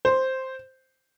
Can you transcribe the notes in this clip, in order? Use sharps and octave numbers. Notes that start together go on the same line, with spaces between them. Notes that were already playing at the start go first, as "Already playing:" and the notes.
C5